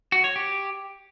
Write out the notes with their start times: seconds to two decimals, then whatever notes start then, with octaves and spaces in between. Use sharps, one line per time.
0.12 F#4
0.24 C#5
0.36 G4